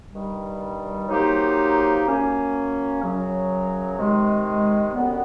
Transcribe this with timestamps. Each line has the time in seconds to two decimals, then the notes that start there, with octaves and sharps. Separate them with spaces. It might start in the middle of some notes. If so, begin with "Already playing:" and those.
0.12 G2 D#3 G3
1.08 F#3 A#3 D#4 G4 C5
2.05 F#3 A#3 C#4
3.01 F#2 C#3 F#3
3.97 C3 D#3 G#3
4.94 F#2 D3 G3 B3